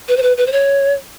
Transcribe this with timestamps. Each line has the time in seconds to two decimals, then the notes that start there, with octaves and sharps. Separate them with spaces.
0.08 B4
0.17 C5
0.23 B4
0.38 B4
0.47 C5
0.52 C#5